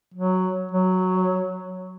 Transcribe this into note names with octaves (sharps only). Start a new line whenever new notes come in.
F#3
F#3